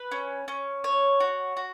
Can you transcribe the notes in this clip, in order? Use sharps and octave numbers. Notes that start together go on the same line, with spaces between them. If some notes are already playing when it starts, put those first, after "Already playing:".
Already playing: B4
C#4
C#4
C#5
F#4
F#4